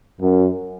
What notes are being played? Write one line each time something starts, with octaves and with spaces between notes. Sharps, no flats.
F#2